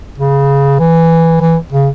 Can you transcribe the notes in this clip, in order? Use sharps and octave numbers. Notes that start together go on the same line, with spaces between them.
C#3
E3
E3
C#3